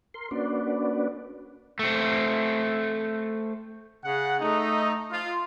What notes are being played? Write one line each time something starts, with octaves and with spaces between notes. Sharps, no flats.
A#4 C6
A#3 C#4 D4 F#4 B4 D5
A3 C4
C#3 F#5
A3 D#4
F4